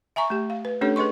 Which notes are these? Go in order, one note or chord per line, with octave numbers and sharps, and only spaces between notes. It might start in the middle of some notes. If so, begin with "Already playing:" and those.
E5 G#5 A#5 C#6
A3 G4
F5
B4
A3 C#4 D4 G4 A4 C#5
G#4 B4 D#5 C6 C#6